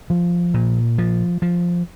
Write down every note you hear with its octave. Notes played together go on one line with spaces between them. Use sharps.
F3
A#2
F3
F3